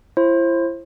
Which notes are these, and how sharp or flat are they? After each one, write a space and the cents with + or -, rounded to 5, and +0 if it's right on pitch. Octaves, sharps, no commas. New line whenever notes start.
E4 +35 C5 +30